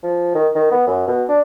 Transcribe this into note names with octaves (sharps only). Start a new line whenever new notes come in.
F3
D#3
D#3
B3
F#2
B2
D4